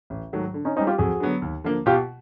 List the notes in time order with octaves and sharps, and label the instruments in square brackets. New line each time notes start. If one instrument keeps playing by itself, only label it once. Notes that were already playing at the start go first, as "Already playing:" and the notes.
[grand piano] A1
G#2 D#3 F#3 A3
D3
[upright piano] C#4 D#4
[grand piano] C4 [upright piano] C#4 D#4
[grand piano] G3
[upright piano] F4 G4
[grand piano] F2 [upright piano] F#4 G#4
[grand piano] D3 F#3 B3
D#2
D3 F3 A#3
[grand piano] B2 [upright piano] F4 G4